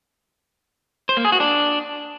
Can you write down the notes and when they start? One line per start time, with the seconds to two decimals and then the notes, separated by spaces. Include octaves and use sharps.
1.09 C5
1.17 A#3
1.25 G#4
1.32 F#4
1.40 D4